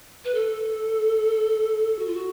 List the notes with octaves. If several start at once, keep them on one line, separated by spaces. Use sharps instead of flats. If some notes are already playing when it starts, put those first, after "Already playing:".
B4
A4
F#4
F4
F#4